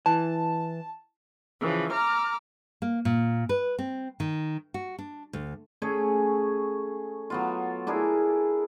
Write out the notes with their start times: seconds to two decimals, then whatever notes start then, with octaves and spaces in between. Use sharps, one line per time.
0.06 E3 A5
1.60 C#3 E3 F3
1.92 A#5 D6 F6
2.82 A#3
3.05 A#2
3.49 B4
3.79 C4
4.20 D#3
4.74 F#4
4.99 D4
5.33 D2
5.82 A3 C#4 G#4 C#5
7.30 F#3 B3 F4
7.87 D4 E4 G#4 A#4